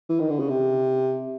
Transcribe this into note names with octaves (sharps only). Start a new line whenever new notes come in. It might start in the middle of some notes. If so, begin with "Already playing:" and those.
E3
D#3
D3
C#3
C3